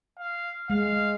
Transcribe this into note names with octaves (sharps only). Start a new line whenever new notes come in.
F5
G#3 F5